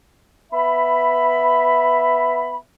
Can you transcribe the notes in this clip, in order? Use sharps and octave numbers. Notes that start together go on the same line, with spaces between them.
B3 E5 B5